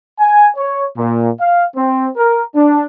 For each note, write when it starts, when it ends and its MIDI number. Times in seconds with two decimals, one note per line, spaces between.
0.19 0.48 80
0.57 0.84 73
0.96 1.29 46
1.40 1.65 77
1.75 2.08 60
2.16 2.42 70
2.55 2.85 62